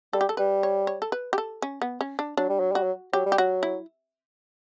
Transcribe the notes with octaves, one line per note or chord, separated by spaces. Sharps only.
G3 A4
G4
A4
G3 B4
C#5
C#5
A4
B4
G4
A4
C#4
B3
C#4
D4
F#3 D4
G3
F#3
G3 F#4
F#3
F#3 G4
G3
G4
F#3 F#4
E4